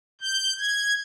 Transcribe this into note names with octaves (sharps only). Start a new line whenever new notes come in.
G6
G#6